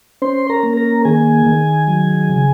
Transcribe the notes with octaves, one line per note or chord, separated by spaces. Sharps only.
C#4 C5 C6
A#4 A#5
A#3
A#4 A#5
D#3 G#4 G#5
D#3
F#3
C#3